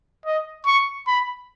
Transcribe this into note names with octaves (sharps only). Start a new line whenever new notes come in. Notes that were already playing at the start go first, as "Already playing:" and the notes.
D#5
C#6
B5